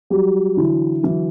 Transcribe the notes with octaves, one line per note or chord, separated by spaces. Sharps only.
F#3 G3 G4
D3 E3 E4
E3 F#3 E4